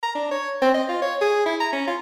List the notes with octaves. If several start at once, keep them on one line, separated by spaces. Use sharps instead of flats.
A#5
D4
C#5
C4
D#5
F4
C#5
G#4
E4
A#5
C#4
F4